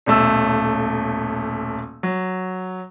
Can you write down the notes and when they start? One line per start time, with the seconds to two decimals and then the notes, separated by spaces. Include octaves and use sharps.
0.06 D#1 B1 A3 E6
2.03 F#3